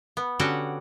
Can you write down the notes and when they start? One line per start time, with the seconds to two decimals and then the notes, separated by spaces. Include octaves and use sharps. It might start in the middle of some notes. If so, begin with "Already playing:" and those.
0.17 B3
0.39 D3 C#4 F#4 G4 F#5 G5